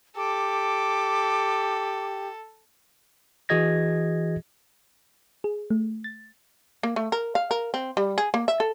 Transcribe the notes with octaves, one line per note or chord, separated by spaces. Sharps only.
G4 A4 D6
E3 F#4 G#4 D#5 G#6 A#6
G#4
A3
A6
A#3
A3
A#4
F5
A#4
C4
G3
G#4
A#3
E5
A4